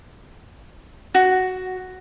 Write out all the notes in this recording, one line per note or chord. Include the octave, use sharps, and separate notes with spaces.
F#4